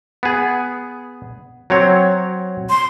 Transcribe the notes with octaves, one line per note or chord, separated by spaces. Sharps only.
B3 G#4
F#3 C4 C#5
C6